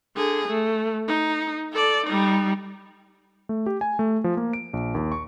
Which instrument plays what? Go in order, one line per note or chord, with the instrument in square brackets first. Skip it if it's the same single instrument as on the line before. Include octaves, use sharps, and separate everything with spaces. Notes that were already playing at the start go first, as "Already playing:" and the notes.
[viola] D3 G#4
A3
D#4
A4 D5
G3 D#4
[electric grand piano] A3
G4
G#5
A3
F3
A#3
D7
A#1
D#2
C#6